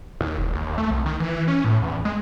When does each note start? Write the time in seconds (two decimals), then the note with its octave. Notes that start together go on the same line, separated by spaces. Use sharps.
0.21 D#2
0.38 E1
0.55 D#2
0.78 A3
0.91 C2
1.06 D#3
1.20 E3
1.33 E3
1.48 C#4
1.65 A2
1.82 E2
2.05 G#3